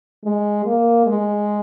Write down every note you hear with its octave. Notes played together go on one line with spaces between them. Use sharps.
G#3
A#3
G#3